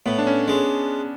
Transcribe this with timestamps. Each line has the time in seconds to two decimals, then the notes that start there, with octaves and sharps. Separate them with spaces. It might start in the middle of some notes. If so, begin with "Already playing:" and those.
0.06 A2 B3
0.18 D4
0.27 C#4
0.48 G#3 C#4